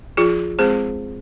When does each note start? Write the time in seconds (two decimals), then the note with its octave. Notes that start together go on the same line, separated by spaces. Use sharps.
0.17 F3 F4 G#4
0.59 G#3 C4 G#4 C5